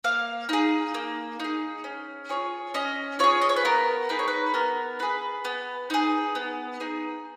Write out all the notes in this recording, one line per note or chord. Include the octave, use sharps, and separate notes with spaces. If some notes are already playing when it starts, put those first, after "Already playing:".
A#3 F5
D#4 G#4
A#3
D#4 G#4
C#4
F4 G#4 C#5
C#4 D#5
F4 G#4 C#5
D#5
C#5
B4
B3 A#4
D#4 G#4 B4
C#5
B4
B3 A#4
D#4 G#4 B4
B3
D#4 G#4
B3
D#4 G#4